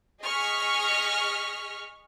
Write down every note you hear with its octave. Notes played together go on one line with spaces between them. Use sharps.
G#4 D#5 C#6 F6 B6